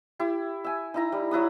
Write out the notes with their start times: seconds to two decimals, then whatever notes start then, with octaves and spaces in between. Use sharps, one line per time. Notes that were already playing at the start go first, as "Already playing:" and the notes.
0.19 E4 G4
0.64 E5 G#5
0.94 D#4 E4 A#5
1.12 G3
1.31 F#3 E4 B4 D#6